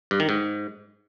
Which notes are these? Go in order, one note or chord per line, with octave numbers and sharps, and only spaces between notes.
G2
D#3
G#2